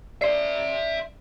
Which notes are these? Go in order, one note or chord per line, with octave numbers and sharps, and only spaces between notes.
D5 E5 C6 C7